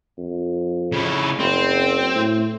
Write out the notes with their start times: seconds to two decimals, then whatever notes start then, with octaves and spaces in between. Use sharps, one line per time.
0.18 F2
0.92 C#3 E4
1.39 F#1 C4
2.15 A2